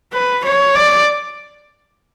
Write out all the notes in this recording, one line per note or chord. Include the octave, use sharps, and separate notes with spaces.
B4
C#5
D5